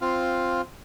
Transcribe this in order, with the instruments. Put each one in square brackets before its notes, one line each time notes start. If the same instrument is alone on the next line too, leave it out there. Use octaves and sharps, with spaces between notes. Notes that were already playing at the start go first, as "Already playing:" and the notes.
[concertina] C4 F4 F5